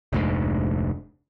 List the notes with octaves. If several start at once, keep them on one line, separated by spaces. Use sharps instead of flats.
F1 D2 G#2